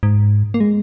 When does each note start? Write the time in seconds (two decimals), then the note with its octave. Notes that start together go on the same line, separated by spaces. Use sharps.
0.03 G#2
0.54 A#3
0.60 G#3